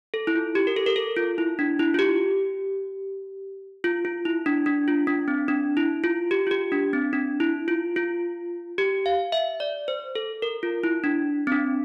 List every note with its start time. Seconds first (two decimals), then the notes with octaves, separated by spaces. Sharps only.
0.14 A4
0.27 E4
0.35 F4
0.55 G4
0.67 A#4
0.76 A4
0.86 A#4
0.96 A4
1.16 F4
1.38 E4
1.59 D4
1.79 E4
1.94 F4
1.99 G4
3.84 F4
4.05 F4
4.25 E4
4.46 D4
4.66 D4
4.88 F4
5.07 D4
5.28 C4
5.48 D4
5.77 E4
6.04 F4
6.31 G4
6.47 F4
6.51 G4
6.72 D4
6.93 C4
7.13 D4
7.40 E4
7.68 F4
7.96 F4
8.78 G4
9.06 F5
9.32 E5
9.60 D5
9.88 C5
10.15 A4
10.42 A#4
10.63 F4
10.84 E4
11.04 D4
11.47 C4
11.52 D4